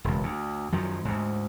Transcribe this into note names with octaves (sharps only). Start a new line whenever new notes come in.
E1 C#2
D2
F#2 D#3 F3 F#3
D2 G#2